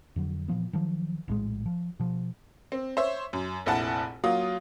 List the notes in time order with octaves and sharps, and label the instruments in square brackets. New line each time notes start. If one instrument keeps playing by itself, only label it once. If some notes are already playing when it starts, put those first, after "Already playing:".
[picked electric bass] F2 D3 F#3
A#2 E3 F3 B3
D#3 F3 F#3
A#1 A2 C#3 G#3
F3
B2 F3
[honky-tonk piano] C4
C5 C#5 E5
F#2
F1 A#1 E4 F#5 A5
F#3 A#3 F4 D#6